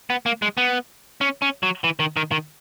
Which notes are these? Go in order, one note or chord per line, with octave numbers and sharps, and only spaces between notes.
B3
A#3
G#3
B3
C#4
C#4
F#3
E3
D#3
D#3
D#3